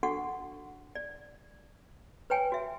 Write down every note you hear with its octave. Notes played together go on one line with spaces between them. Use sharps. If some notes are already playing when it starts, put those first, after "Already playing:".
D4 F#4 A4 F#5 C#6
D5
B4 C#5 G5 G#5
F#4 E5